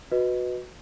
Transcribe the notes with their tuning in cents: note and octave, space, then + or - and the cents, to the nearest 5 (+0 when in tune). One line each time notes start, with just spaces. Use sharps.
F#4 -10 B4 +0 D#5 +0